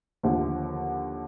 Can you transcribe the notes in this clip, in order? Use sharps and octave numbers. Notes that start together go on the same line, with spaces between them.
D#2 D3 F3